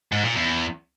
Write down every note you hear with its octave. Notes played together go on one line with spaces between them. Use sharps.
G#2
A#2
E2